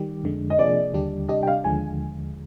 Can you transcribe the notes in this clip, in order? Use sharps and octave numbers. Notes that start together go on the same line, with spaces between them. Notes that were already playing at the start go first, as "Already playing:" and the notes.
Already playing: D#3 G3 G4
F2 D3 G#3
D#5
C3 F3 A#3 D4 G#4 D5
D#2 D3 G3 D4 G4
C3 G3 D4 G4 D#5
G5
F5
D#2 D3 F3 G#3 G#5